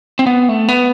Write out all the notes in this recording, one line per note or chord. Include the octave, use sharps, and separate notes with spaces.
C4
B3
A3
B3